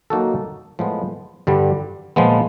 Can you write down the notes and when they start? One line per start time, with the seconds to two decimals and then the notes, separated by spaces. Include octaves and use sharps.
0.10 F#3 A#3 D#4 F#4 A4
0.79 A2 F3 G#3 B3
1.47 G2 D3 G3
2.16 A#2 F3 G#3 B3